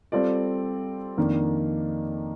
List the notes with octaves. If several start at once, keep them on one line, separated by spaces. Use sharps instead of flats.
G3 C4 F4 A4 D5
F2 D#3 A#3 D4